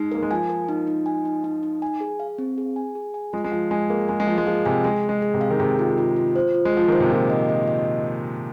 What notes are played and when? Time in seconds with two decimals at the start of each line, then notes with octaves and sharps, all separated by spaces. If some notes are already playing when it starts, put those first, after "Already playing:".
Already playing: G#3 D#4
0.12 A#3 A#4
0.23 G#3
0.31 F3 G#5
0.50 A#4
0.69 D#4
0.87 D#4
1.06 G#5
1.25 D#4
1.44 D#4
1.63 D#4
1.82 G#5
2.01 G#4
2.20 F5
2.39 C4
2.58 G#4
2.76 G#5
2.95 G#4
3.14 G#5
3.33 G#3 F4
3.44 G#3
3.52 F3 F4
3.71 G#3 G#5
3.90 A#3 G#4
4.09 G#3 G#5
4.20 G#3
4.27 F3 F5
4.38 G#3
4.47 F3 G#4
4.66 C3 G#5
4.84 G#3 G#4
5.03 G#4
5.09 G#3
5.22 G#4
5.34 C3
5.41 F5
5.50 D#3
5.60 C3 G#4
5.79 F4
5.98 F4
6.16 F4
6.36 C5
6.55 F4
6.65 G#3
6.73 F3 F4
6.88 D#3 C5
7.00 C3
7.11 A#2 F4
7.30 D#5
7.49 D#5
7.68 D#5